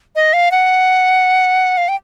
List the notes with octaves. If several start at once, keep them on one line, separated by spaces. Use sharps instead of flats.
D#5
F5
F#5
F5
G5